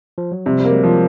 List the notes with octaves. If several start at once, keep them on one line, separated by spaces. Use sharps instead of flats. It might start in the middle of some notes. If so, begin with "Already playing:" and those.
F3
F#3
C3 F3 G3
G3 A#3
F#3 G#3
F3